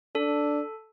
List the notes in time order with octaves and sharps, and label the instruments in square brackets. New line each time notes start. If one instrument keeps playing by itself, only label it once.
[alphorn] D4 [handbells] A4